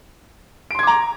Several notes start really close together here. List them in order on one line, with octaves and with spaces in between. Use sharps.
D7 C6 G#6 D6 A#5